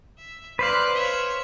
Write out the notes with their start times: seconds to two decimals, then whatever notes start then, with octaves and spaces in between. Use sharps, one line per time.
0.18 E5
0.59 B4 C5 D5 F5 F#6
0.95 C#5 E5